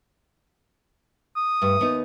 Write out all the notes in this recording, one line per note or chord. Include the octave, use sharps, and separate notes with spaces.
D#6
G2 A3
D#2 B3 D#4